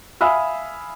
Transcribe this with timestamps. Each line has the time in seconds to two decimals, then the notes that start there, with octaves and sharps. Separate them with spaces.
0.21 E5 F5 G#5 B5 D#6 E6